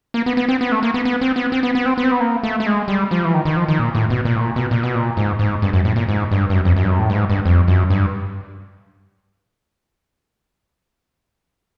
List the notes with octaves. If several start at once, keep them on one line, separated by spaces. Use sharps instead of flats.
A#3
B3
B3
C4
B3
A3
A#3
B3
B3
C4
B3
C4
B3
B3
C4
B3
C4
B3
A#3
A3
A3
G#3
G3
F3
E3
D#3
D#3
F3
D#3
A#2
A2
B2
A#2
A2
A#2
B2
A#2
B2
A#2
G#2
G#2
G2
F#2
A2
A#2
G#2
G2
G2
F#2
F2
F#2
G2
F#2
A2
G2
G#2
G2
F2
F#2
G2